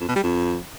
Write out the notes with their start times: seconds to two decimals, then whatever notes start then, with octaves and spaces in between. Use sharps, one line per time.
0.01 F2
0.08 B2
0.16 G3
0.23 F2